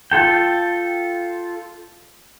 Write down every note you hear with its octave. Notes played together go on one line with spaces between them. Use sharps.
F4 A4 G5